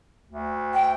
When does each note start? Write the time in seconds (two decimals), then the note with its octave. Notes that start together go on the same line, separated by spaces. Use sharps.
0.26 D2
0.74 G5